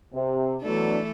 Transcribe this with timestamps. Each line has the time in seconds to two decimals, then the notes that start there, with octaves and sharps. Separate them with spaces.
0.14 C3
0.63 E3 F#3 A3 B3 D4 A4